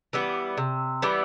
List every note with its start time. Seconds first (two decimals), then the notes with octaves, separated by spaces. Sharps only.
0.13 E3 G3 B3
0.58 C3
1.02 E3 G3 B3